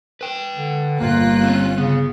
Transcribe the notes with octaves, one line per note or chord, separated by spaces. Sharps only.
B4 G5
D3
G1 A#3 F4 F#6
C4 C#4
C#3 B3